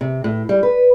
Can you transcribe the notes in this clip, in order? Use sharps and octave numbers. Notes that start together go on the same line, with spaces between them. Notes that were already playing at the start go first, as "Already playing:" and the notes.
C3
A2
G3
B4